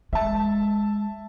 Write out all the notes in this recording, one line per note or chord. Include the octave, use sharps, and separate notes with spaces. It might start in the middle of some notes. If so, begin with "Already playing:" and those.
G#3 E5 A5